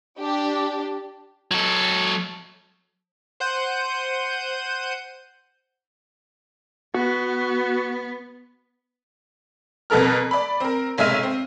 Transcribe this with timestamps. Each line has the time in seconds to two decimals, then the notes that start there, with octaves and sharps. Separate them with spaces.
0.19 D4 G4
1.51 F#3 A4
3.40 C5 F#5 G6 D#7
6.94 B3 F#4
9.90 F2 B2 B3 A4 A#4 F6
10.31 D5 B5
10.60 C4 A#4
10.98 F1 B1 G#3 E5 F6 D#7
11.23 C4